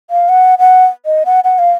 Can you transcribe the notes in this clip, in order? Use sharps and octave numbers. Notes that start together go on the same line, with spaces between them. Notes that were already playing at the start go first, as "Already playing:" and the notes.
F5
F#5
F#5
D#5
F#5
F#5
F5